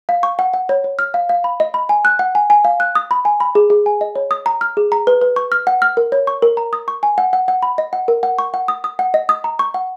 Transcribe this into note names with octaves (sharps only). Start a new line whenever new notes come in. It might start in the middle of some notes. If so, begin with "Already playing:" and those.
F5
C#6
F#5
F#5
C#5
C#5
F6
F5
F5
B5
D#5
B5
G#5
F#6
F#5
G#5
G#5
F5
F#6
D#6
B5
G#5
B5
G#4
G#4
G#5
D#5
C#5
D#6
A#5
F6
G#4
A#5
B4
B4
C#6
F6
F#5
F6
A#4
C#5
C#6
A#4
A#5
D#6
C#6
G#5
F#5
F#5
F#5
B5
D#5
F#5
A#4
F#5
C#6
F#5
D#6
D#6
F#5
D#5
D#6
A#5
C#6
F#5